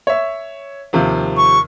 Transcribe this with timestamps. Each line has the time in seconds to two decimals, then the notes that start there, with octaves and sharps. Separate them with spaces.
0.07 C#5 E5
0.93 D#2 C3 F3
1.37 C#6